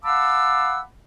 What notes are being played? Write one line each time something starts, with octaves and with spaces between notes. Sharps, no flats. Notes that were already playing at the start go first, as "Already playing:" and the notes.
F5 F#5 A5 B5 D6 E6